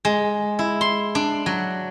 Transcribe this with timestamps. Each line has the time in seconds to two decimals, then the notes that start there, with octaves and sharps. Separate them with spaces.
0.05 G#3
0.59 E4
0.81 C6
1.15 D4
1.46 F#3